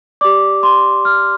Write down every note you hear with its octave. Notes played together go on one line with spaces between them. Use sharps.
G4 D5 D6
C6
F6